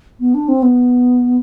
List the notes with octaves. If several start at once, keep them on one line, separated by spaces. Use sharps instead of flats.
B3
D4
C4
B3